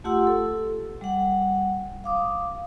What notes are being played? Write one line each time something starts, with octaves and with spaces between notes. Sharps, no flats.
A3 F4 G4 F#5 C6 E6
A4
G3 F#5
F5 D6 D#6